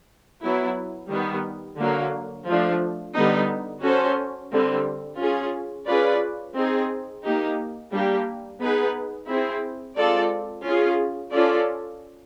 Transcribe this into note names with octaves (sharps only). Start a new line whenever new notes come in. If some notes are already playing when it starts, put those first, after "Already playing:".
F#3 B3 E4
D#3 G3 B3
D3 F#3 A#3
F3 A3 D4
D3 G3 B3 D#4
C#4 F#4 A4 C5
D3 G3 C4
C#4 F4 G#4
C#4 F4 G#4 B4 D5
C4 D#4 G#4
A#3 D#4 G4
G3 A#3 D4 G4
B3 D#4 G#4 B4
C4 E4 G#4
G#3 C4 F4 A4 D5
C#4 F4 G#4
C#4 F4 A4 D5